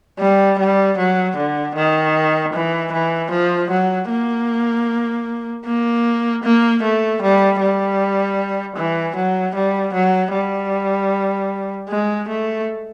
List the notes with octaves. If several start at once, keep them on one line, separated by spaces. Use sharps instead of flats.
G3
G3
F#3
D3
D#3
E3
E3
F3
F#3
A#3
A#3
A#3
A3
G3
G3
E3
F#3
G3
F#3
G3
G#3
A3